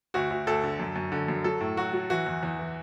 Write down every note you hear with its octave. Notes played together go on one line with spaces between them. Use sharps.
D2 F#4
D2
D2 A4
D3
F#2
F#2
D3
F#2
F#3 A4
A2
F#3 F#4
F#3
E3 F#4
E2
E2
E3